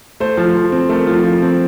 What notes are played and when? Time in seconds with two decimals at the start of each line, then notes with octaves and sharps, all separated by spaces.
0.20 A3 C5
0.37 F3
0.55 F3
0.72 C4
0.89 A3 A#4
1.07 F3
1.24 F3
1.42 C4